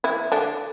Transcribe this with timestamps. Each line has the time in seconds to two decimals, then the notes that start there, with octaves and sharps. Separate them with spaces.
0.04 E3 E4
0.32 D3 D4